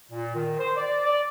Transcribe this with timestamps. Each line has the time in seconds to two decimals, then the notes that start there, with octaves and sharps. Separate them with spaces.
0.12 A#2
0.35 D#3
0.59 C5
0.76 D5
1.05 D5